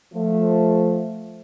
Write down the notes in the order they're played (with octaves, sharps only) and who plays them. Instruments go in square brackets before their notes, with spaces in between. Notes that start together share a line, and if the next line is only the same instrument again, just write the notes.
[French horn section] F3 A3